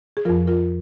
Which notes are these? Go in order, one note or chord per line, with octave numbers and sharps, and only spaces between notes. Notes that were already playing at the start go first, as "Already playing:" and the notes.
G#4
F2 F3 F4 A#4
F4 A#4